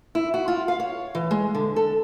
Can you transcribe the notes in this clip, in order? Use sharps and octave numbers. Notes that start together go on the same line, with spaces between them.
E4
F#4
F4
F5
C#5
E3
G#3
D3
A4